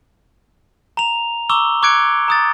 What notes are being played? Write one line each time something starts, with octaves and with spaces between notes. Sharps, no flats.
A#5 F7
A#5 C#6 D6 E6 G7
C#6 D6 F#6 G#6 C#7 D7
A#5 D#6 A6